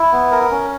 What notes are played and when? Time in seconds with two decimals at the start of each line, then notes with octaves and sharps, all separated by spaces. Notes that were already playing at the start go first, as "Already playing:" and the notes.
Already playing: E4
0.12 B3
0.31 A#4
0.51 C#4